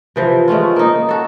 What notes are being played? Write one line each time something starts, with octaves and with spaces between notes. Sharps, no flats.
C3 E3 F3
G#3 A3 C#4 F4
A#3 D#4
F#4 A4